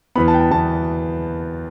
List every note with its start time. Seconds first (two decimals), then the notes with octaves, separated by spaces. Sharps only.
0.15 E2 E3 B3 B5
0.28 A5
0.34 G5
0.40 A5
0.51 E2 E3 B3 A5